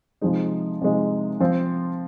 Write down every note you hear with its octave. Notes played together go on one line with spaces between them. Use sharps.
C3 F3 G#3 D#4
C3 F3 G#3 D#4
F3 C4 F4